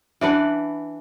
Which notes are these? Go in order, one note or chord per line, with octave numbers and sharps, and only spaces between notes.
E3 D4 B4 F#5